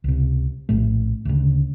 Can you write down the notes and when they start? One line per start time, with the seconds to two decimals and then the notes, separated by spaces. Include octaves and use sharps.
0.04 C#2 C3
0.69 A#1 A2 A3
1.25 D2 C#3